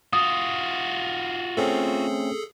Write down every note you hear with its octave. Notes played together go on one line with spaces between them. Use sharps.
F4 F#4 D#6
A3 C4 C#4 G#4 A4